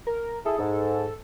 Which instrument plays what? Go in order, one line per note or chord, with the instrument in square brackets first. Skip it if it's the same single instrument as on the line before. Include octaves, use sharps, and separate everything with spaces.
[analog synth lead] A#4
[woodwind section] E4 G#4 [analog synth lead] A4
[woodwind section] G#2